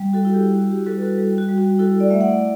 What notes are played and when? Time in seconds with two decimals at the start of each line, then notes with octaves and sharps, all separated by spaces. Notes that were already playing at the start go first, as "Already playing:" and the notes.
Already playing: G3
0.13 F#4 A4
0.25 E4
0.34 G4
0.55 E4 F#4
0.71 G4
0.86 G3 F#4 A4
0.97 B4
1.01 F#4 A4
1.18 G3
1.38 F#4
1.49 G3
1.58 F#4
1.79 E4 F#4 A4
2.00 D5
2.10 A3 E5
2.21 D5 F#5
2.37 D5